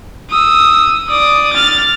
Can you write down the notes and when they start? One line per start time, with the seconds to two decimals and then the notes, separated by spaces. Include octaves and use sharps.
0.30 D#6 E6
1.08 D5 D#6
1.53 F6 A6